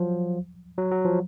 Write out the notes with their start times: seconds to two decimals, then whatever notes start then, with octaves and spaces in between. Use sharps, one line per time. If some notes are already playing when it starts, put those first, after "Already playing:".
Already playing: F3 F#3
0.78 F#3
0.91 F#3
1.05 F3